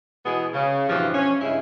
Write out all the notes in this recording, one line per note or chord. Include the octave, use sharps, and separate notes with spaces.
B2 E3 G#3 B3 G#4
C#3
G2 B2 E3 F3
C#4
G2 C#3 G#3 E4